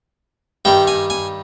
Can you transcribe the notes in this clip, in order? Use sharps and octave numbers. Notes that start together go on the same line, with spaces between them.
G2 D#3 G3 G5
G#5
G#5